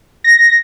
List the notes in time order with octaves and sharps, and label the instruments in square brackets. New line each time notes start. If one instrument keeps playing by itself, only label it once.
[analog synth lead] A#6